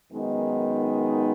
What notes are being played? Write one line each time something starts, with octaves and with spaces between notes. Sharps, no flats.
F#2 D#3 G#3 B3 D#4